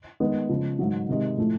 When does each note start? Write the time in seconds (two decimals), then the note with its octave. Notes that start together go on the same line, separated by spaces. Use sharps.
0.20 D#3 G#3 B3
0.49 C#3 F3 G#3
0.79 G#2 D#3 F#3
1.09 C3 D#3 G#3
1.38 A2 F3 A3